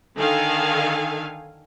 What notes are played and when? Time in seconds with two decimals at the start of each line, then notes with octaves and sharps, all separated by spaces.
0.17 D3 D#3 A4 F5 G#5